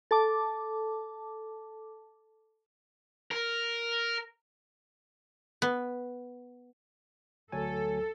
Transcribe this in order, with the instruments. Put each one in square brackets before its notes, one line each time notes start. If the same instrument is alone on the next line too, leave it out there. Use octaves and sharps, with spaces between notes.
[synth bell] A4 A5 D6
[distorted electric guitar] A#4
[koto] B3
[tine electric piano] D2 F#3 G#5 [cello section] A4